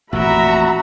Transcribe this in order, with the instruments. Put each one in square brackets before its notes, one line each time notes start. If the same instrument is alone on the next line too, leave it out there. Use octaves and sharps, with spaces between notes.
[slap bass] A1 F2 A#2 [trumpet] F#4 [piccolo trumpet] E5 [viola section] A#5 B5